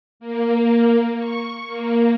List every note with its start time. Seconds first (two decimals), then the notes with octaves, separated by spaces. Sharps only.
0.20 A#3
1.17 C#6
1.67 A#3